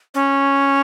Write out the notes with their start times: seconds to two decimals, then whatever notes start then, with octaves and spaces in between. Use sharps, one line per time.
0.14 C#4